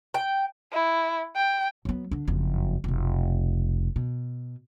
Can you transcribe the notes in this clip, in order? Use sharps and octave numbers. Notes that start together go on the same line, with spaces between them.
G5
E4
G5
F#3 B3
D3 D4
F#1 F2
F1 B1
B2